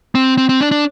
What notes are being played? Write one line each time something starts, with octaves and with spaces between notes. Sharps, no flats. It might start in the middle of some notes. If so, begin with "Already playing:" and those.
C4
C4
C4
D4
D4